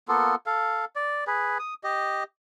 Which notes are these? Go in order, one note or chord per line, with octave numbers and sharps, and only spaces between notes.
A#3 B3 F4 A4
A4 F5
D5
G#4 B4
D#6
G4 D#5